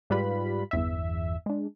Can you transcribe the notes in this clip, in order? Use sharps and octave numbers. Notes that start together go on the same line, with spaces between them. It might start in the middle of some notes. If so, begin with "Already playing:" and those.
G#2 G3 F4 B4 B5
G1 E2 E5
G#3 D4